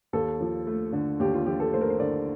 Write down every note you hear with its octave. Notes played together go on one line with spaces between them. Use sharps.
D#2 A4
F3
A3
D3
D#2 G4
F4
F3 G4
A4
A3 C5
A#4
C5
D3 D5